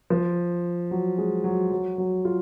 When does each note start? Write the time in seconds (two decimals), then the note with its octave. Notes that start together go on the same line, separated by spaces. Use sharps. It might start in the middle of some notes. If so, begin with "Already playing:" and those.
0.10 F3
0.91 F#3
1.18 G#3
1.44 F#3
1.71 F#3
1.98 F#3
2.25 F4